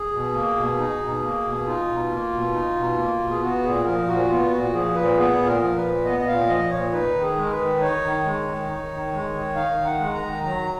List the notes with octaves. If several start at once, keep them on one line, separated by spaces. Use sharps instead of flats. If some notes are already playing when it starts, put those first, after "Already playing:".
Already playing: G#4
B2
A#3
B2
D#4
B2
A#3
B2
D#4 F4
B2
A#3
B2
D#4
B2
A#3
B2
G#4
B3 F#4
A#2 G#4
F3 A#4
A#2 F#4
B3 F4
A#2 F#4
F3 G#4
A#2 B4
B3 G#4
A#2
A#4
F3
B4
A#2
B3 D#5
D#5
A#2 F5
F3 D#5
A#2 C#5
D#4 B4
D#3
G#4
G#3
A#4
B4
D#3
D#4 C#5
D#3
G#3
D#3
D#4
D#3
G#3
D#3
D#4 F5
D#3
F#5
G#3
A#5
D#3
F#3 A#5